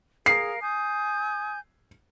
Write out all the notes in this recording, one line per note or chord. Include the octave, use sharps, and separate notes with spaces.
G#4 A#4 F5 C7
G#5 D#6 G6